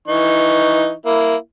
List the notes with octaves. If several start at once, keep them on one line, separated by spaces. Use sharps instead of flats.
E3 D#4 C#6
A#3 E4